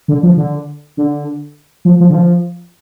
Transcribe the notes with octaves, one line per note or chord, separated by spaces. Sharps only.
D3
F3
D3
D3
F3
F3
D3
F3